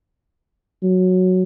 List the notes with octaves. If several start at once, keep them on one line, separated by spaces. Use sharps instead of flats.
F#3